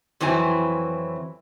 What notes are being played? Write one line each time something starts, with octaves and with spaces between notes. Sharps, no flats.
F2 E3 F#3 C4 E4 G#5